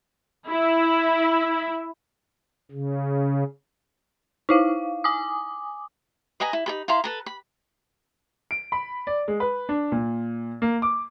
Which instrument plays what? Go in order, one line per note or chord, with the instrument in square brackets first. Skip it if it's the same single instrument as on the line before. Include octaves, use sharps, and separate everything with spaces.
[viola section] E4
[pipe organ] C#3
[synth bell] D#4 E4 F5
G#5 D6 D#6
[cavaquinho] B4 D#5 G#5 A#5
E4
D#4 A4 B5
E4 F5 A#5 C6
A4 B4 A#5
B5
[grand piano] D7
B5
D5
G#3
B4
D4
A#2
A#3
D6